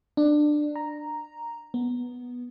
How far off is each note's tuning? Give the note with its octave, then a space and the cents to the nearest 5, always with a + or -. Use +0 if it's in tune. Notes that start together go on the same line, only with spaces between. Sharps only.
D4 +20
A#5 +0
B3 -5